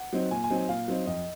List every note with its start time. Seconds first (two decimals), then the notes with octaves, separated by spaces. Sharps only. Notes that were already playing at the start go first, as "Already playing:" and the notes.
Already playing: F#5
0.13 F#3 C4 D#4
0.31 A#2 G#5
0.44 G#5
0.50 F#3 C4 D#4
0.56 G#5
0.69 A#2 F5
0.88 F#3 C4 D#4
1.06 F2 D#5